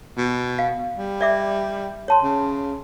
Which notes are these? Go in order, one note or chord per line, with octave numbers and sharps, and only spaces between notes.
B2
F5
G3
D5 E5 D6
C#5 A5 C6
C#3